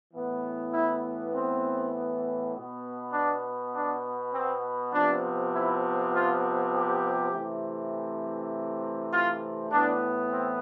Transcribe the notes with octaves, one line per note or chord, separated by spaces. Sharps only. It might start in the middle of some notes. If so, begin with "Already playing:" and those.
A2 E3 B3
E4
C4
B2 B3
D4
D4
C4
C3 F3 B3 D4
E4
F4
G4
C3 E3 A3 C4
F4
A2 E3 B3 D4
C4